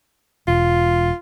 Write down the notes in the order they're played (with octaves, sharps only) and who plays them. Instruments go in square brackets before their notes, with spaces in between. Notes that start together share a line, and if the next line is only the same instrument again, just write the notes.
[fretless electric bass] E1 [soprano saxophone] F4